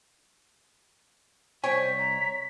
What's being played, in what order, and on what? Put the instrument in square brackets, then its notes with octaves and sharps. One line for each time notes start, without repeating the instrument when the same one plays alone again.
[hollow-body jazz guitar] C2 G5 G#5 [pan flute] C5 [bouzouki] C#5 [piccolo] B6
[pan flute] A#5